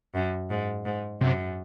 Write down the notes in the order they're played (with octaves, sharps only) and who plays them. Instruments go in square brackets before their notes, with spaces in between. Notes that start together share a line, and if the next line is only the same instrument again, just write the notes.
[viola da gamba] F#2
G#2
G#2
[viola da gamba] F#2 [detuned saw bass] C3